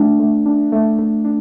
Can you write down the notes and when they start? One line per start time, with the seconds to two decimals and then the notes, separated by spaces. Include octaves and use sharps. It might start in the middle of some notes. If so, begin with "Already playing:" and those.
Already playing: A3 D4
0.20 A3
0.46 D4
0.72 A3
0.99 A3
1.25 D4